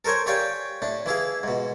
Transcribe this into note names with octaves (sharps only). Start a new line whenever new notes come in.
A4 A#4 C5 C#5 G#5
G4 C#5 D5 F5 G5 G#5
A2 D4
E3 E4 G#4 F5
G#2 B2